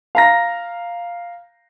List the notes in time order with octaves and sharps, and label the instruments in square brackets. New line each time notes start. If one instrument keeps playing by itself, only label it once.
[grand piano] F5 A#5 A#6